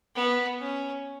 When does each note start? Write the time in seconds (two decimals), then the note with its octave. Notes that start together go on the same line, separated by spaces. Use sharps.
0.15 B3
0.60 C#4